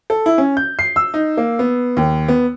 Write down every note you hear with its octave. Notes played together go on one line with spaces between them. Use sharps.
A4
E4
C#4
G6
C7
E6
D#4
A#3
B3
D#2
B3